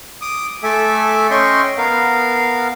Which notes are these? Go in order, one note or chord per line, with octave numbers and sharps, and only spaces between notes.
D6 D#6
A3 A4 E5 G#5 D6
C#4 D#5 G5 C6 C#6
B3 A#4 F5